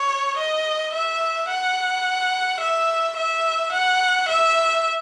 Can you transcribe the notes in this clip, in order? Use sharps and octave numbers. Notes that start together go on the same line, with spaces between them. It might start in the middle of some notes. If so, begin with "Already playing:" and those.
Already playing: C#5
D#5
E5
F#5
E5
E5
F#5
E5